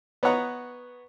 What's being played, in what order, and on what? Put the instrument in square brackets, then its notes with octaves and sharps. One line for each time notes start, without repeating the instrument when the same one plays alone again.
[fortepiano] B3 B4 C#5 D#5 F#5 A#5